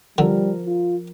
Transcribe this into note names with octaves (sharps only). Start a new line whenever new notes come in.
D3 F3 G3 A#4
F4